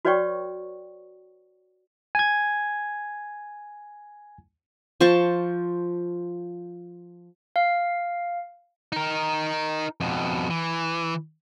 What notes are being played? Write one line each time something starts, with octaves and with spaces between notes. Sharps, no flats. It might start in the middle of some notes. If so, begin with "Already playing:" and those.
F#4 B4 C#5 D5 G5 C#6
G#5 G#6
F3 C5 A5 C#6
F5
D#4 A#4
F2 B2
E3